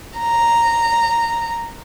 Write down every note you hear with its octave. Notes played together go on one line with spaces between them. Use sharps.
A#5